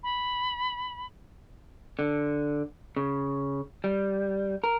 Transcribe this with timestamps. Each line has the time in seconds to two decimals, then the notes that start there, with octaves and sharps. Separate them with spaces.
0.03 B5
1.99 D3
2.97 C#3
3.84 G3
4.64 A#4